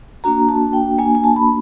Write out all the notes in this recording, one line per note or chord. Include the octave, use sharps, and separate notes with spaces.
A#3 D4 F#4 A#5
A5
G5
A#3 D4 F#4 G#5
G#5
A5
B5